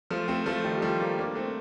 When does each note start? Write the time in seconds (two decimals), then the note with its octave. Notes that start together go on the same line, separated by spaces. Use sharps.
0.11 F3 A3
0.28 A3 C4
0.46 F3 A3
0.64 D#3 G3
0.78 G3
0.82 F3 A3
1.00 G3 A#3
1.18 A#3 D4
1.35 A3 C4